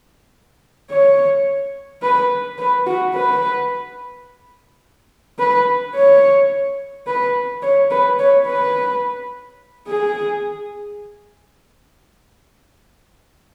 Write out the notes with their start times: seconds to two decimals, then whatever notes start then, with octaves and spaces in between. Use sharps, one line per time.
0.90 C#5
2.02 B4
2.58 B4
2.86 F#4
3.14 B4
5.39 B4
5.95 C#5
7.07 B4
7.62 C#5
7.91 B4
8.19 C#5
8.46 B4
9.87 G#4